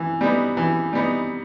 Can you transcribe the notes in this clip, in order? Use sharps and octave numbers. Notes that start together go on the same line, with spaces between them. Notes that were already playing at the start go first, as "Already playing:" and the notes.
Already playing: E3
G3 B3 D#4
E3
G3 B3 D#4